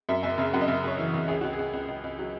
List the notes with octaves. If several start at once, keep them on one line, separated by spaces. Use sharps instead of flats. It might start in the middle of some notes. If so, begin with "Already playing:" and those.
F#2 E5
F#1 E5
C#3 E5
F#2 F#5
D#5
C#3 E5
F#2 C#5
E3
C#3
C#2 G#4
C#2 F#4
G#4
C#2
C#2
C#2
C#2
F#3